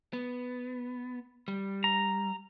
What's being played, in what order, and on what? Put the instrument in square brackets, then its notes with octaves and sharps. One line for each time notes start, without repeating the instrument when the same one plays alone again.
[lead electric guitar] B3
G3
[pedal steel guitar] A#5